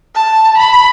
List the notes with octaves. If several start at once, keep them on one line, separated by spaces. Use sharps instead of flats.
A5
B5